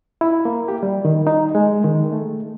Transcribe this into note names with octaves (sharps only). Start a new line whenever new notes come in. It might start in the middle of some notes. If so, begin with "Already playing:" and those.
E4
A#3
G4
G3
D#3
D#4
G#3
D#3
A3